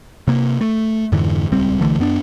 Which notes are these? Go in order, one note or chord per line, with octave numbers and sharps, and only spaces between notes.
C3 A#3
A3
F2 G#2 D3 E3
D#1 C#2 G3 C4
B1 D3 E3 A3
F#2 B3 D4